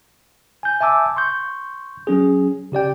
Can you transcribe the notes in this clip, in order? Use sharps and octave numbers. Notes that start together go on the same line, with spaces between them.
G#5 G6
E5 G#5 A5 D6 E6
C6 C#6 G6
F#3 C#4 G#4
C#3 G4 D5 G5